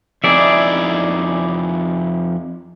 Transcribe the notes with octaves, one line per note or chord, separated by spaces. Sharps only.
F2 D#4 E4 G#4 D5 E5